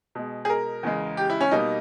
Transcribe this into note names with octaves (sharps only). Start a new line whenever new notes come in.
B2 G#3
G#4
A#4
E2 C#3 G#3
G4
E4
C#4
B2 G3 A#3 D#4